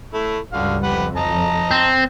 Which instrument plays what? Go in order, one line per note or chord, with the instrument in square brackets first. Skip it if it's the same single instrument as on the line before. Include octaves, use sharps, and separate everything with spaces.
[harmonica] A3 E4
[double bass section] C#2 G2 G3 [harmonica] D3 F#4 F5
[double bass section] F2 [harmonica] G4 B4 F#5
[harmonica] D#5 A5 A#5
[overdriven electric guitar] C4